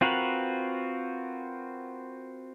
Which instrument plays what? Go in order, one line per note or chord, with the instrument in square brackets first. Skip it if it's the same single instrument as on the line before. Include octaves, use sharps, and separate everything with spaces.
[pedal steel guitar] C4 F4 F#4 A#4 B4